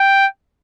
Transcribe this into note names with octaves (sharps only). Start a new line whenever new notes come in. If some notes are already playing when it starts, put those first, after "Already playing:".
Already playing: G5